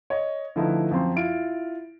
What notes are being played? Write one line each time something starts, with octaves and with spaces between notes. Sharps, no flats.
C#5 D#5
D3 F3 A3 D#4 E4 B4
F#2 F3 C4 C6
E4 F4 D7